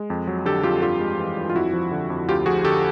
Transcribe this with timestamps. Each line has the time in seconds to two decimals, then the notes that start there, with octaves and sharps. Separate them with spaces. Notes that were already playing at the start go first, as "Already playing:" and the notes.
Already playing: G#3
0.10 F2
0.27 F#3
0.45 D3 G4 A4
0.63 F2 F4 G4
0.82 G2 F4 G4
1.00 G#3
1.19 E3
1.37 G2
1.50 F4
1.55 F2 E4 F#4
1.73 F3
1.91 D3
2.10 F2
2.28 D2 F4 G4
2.46 F3 F#4 G#4
2.65 D3 G4 A4